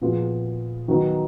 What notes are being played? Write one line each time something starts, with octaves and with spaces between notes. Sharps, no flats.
A#2 F3 B3 F4 G#4
D#3 F#3 B3 D#4